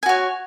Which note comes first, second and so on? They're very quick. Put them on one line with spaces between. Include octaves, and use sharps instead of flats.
G#5 F#4 C#5